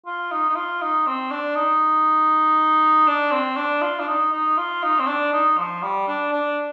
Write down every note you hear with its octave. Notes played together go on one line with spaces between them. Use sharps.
F4
D#4
D#4
F4
D#4
C4
D4
D#4
D4
C4
D4
F4
D4
D#4
D#4
F4
D#4
C4
D4
D#4
F3
G3
D4
D4